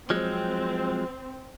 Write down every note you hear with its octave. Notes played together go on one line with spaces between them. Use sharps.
F3 F#3 G#3 C4